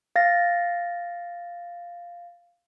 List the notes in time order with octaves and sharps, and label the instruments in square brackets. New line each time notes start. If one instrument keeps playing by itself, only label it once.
[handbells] F5 A6 A#6